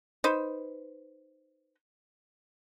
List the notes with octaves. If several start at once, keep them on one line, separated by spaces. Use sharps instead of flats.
D#4 B4 C5